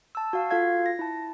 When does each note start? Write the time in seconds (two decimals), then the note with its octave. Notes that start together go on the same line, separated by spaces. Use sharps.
0.15 A5 E6
0.33 F#4 F5
0.51 F4 A4 F5 G#6
0.86 A#6
0.99 E4 A5